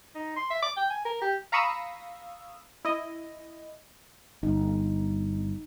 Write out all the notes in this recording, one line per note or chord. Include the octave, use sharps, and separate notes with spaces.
D#4
C6
E5
D6
G5
G#5
A#4
G4
F5 A#5 B5 C#6 D#6 E6
E4 D#5
G1 D#4